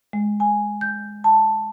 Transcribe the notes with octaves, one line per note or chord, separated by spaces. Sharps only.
G#3
G#5
G6
A5